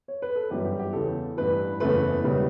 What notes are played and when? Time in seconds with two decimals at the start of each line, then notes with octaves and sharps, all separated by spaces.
0.08 C#5
0.22 B4
0.36 A4
0.50 G1 F#2 E3 G3 B3 G4
0.65 G4
0.79 G4
0.93 E2 C#3 E3 A4
1.37 A1 G2 E3 B4
1.80 F#1 E2 C#3 E3 A3 B4
2.24 E1 C#3 G3 B3